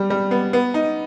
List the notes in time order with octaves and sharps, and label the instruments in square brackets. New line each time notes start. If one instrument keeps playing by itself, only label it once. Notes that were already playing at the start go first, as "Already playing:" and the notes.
Already playing: [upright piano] G3 G4
G3
B3
B3
D#4